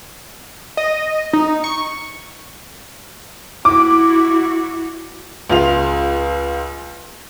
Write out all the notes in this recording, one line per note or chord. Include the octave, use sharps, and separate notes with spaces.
D#5
D#4
C#6
E4 F#4 D6
C#2 C#3 F4 F7